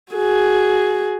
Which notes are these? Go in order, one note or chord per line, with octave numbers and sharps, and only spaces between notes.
F#4 G#4